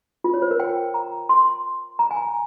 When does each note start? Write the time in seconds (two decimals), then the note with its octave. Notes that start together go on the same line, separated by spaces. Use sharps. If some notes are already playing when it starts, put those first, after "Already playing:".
0.24 F4
0.34 C#5
0.42 C5
0.51 A#4
0.60 G5
0.94 A#5
1.29 C6
1.99 A#5
2.11 G#5
2.16 A#5